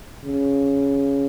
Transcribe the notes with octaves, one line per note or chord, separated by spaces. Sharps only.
C#3